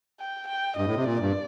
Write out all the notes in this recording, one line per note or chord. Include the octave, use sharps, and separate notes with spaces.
G5
G5
G2 D#5
A2
C3
A#2 D5
G2